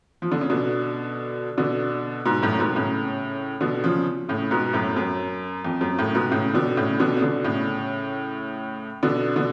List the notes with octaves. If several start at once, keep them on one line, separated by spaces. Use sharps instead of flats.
F3
D3
C#3
B2 D3
B2 D3
G#2 B2
F#2 A2
G#2 B2
A2 C#3
B2 D3
C#3 F3
A2 C#3
G#2 B2
F#2 A2
F#2
F2
F#2
A2 C#3
G#2 B2
A2 C#3
B2 D3
A2 C#3
B2 D3
C#3
B2 D3
A2 C#3
B2 D3
B2 D3